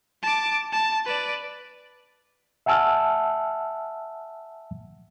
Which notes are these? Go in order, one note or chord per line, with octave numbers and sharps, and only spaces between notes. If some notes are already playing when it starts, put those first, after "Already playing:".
A5 D6
A5
B4 D5
E5 F#5 G#5 A5 E6 F6